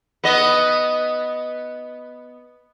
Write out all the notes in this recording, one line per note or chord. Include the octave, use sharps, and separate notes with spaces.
B3 D#5